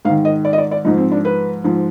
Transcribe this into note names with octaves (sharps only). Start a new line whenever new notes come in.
G#2 D#3 F5
D#5
D5
D#5
D5
D5
G#2 F3 D#4
C4
D4
B4
G#2 F3